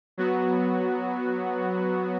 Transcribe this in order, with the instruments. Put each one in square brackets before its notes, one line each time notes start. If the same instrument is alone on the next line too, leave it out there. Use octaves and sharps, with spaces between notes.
[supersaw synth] F#3 B3 F#4